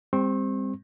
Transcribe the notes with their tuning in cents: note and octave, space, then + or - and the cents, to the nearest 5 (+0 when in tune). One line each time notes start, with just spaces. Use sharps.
G3 +40 C4 +0 C#6 -45